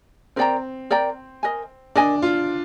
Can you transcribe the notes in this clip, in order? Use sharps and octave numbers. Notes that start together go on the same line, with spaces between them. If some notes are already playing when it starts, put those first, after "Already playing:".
C4 A#4 D5 G5 A#5
A#4 D5 G5 A#5
A#4 D#5 G#5
D4 A#4 D#5 G#5
F4